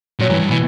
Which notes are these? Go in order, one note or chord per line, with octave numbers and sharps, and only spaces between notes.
A#2 F#3
G2 E3
G2
B2 E3